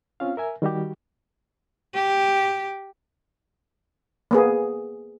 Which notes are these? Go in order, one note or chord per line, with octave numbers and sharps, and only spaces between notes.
C4 C#4 F4 F5
A#4 E5 G#5
D#3 G3 F#4 G4
G4
A#3 B3 G#4